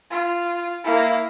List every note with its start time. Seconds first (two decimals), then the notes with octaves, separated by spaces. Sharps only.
0.10 F4
0.84 A#3 E4